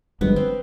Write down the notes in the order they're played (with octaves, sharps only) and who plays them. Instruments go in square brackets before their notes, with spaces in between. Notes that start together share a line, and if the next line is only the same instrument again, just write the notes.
[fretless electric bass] G1 G2 F3 G#3 [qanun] B3
[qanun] C4